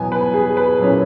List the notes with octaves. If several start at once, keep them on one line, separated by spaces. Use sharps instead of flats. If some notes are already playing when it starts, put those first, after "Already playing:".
Already playing: E2 B2 F#3 B3 G#5
B4
G#4
B4
A#2 F#3 C#4 E4